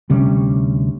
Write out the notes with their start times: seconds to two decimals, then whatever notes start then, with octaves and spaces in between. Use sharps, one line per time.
0.10 D2 C3 G3 C#4